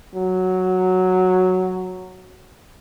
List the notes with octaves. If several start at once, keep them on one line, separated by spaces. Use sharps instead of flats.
F#3